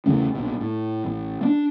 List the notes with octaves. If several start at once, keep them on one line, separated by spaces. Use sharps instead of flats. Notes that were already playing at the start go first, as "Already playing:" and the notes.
E2 C#3 A3 C#4
A#1 B2
A2
A1
A#3 D4